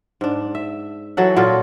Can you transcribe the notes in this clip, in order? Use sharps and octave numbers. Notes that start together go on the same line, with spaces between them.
G#2 D4
E5
E3 F#3 A4 F#5
A#2 F#3 F4 A4